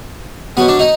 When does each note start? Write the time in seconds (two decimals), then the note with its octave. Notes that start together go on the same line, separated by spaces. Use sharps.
0.57 B2 F#3 B3
0.68 D4
0.79 D#4